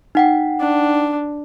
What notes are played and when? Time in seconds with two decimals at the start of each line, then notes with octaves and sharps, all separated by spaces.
0.15 D#4 F#5 G5
0.60 D4